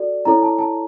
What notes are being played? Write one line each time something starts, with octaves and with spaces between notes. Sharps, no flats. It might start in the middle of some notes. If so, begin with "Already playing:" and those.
Already playing: F#4 A4 D5
E4 A4 C#5 A#5
A5
A5